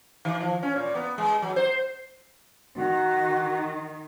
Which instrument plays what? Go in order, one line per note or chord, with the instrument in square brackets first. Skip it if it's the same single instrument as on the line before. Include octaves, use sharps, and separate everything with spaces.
[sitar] D#3
F3
C#4
A#2
B3
G#3
F#3
C5
[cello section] D#3 [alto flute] F#4